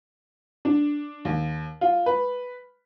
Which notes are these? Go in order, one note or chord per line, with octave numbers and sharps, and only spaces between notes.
D4
D#2
F4
B4